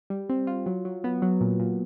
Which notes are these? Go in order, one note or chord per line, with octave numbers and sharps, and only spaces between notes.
G3
C4
F4
F#3
F#3
B3
F#3
A#2
A#2